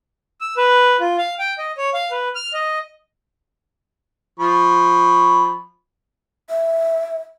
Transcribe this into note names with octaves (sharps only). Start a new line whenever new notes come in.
E6
B4
F4
F5
G5
D#5
C#5
F5
B4
F6
D#5
F3 B5 C#6
E5